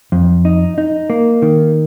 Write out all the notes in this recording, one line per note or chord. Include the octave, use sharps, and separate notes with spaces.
F2
D#4
D#4
A#3
D#3